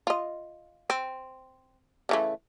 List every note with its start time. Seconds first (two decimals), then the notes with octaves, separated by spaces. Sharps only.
0.07 F4 D#5
0.90 C4
2.09 C#3 E3 A3